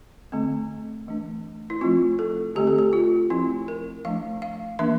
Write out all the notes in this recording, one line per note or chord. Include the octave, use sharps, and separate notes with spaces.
D3 A3 C4
E3 A3 D4
E4
F3 A3 C4 F4
A4
D3 A3 C4 G4
A4
G4
F4
F3 A3 C4 E4
A#4
F3 A3 D4 F5
F5
E3 A#3 D4 E5